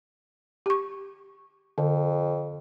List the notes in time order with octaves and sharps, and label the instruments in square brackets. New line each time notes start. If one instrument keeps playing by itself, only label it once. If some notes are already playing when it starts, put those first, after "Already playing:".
[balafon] G4 C#6
[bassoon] F2 [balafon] D3